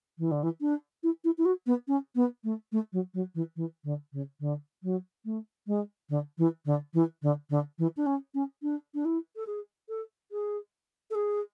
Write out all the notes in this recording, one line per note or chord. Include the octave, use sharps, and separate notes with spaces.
E3
D3
E3
D4
E4
E4
E4
F#4
B3
C#4
B3
A3
A3
F#3
F#3
E3
E3
D3
C#3
D3
F#3
A3
G#3
D3
E3
D3
E3
D3
D3
E3
D4
C#4
C#4
D4
D4
E4
A4
G#4
A4
G#4
A4
G#4